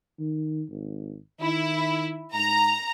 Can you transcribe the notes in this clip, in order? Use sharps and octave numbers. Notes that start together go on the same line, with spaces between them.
D#3
G#1
D#3 E4
G#2 A#5